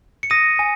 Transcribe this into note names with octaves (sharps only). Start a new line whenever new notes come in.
C#7
D#6 A#6 D#7
G#5